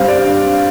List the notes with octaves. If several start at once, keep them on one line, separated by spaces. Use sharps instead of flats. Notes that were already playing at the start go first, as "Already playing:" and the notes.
Already playing: G2 G3 C4 C5 F5
D5
G2